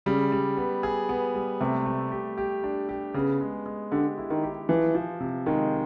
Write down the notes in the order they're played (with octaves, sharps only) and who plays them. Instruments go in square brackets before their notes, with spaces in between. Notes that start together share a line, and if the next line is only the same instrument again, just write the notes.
[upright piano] C#3 [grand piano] G3
[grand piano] G3
B3
G#4
B3
G3
[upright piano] C3 [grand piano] A3
[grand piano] A3
G4
G4
D4
G4
[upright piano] C#3 [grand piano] B3
[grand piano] G#3
G#3
[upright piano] D3 [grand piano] G4
[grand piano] E4
[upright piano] D#3
[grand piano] G4
[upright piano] E3 [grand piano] F3
[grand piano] F3
C3
[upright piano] D#3 [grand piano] G#3